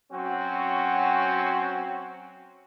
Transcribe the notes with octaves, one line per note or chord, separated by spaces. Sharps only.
F#3 C4 C#4 F#4